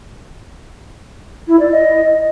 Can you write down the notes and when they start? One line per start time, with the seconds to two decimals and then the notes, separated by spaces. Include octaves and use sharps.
1.48 E4
1.60 D5
1.71 D#5